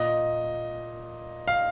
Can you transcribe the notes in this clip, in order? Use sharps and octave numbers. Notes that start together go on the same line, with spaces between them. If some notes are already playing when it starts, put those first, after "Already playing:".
Already playing: A#2 D#5
F5